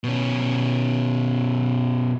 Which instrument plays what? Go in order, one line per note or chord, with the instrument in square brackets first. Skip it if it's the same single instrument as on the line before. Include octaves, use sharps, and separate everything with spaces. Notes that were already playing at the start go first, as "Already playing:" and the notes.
[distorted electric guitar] B2 C#4